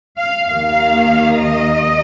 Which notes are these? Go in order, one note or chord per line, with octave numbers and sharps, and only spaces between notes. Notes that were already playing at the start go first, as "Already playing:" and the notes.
F5
D#2 D#3 A#3 F5
D#5